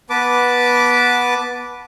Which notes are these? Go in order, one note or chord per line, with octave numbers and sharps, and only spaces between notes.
B3 B4 A5 D6